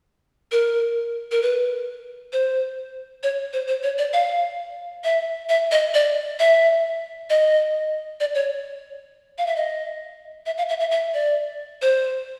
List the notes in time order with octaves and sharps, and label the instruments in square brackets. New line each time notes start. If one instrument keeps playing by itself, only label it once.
[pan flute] A#4
A#4
B4
C5
C#5
C5
C5
C#5
D5
F5
E5
E5
D#5
D5
E5
D#5
D5
C#5
F5
E5
D#5
E5
F5
E5
E5
E5
D5
C5